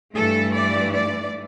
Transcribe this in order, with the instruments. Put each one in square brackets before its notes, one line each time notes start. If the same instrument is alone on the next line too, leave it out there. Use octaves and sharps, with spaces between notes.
[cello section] G2 E3 A3 A4
D5
D5